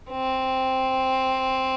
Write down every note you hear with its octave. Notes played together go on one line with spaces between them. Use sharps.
C4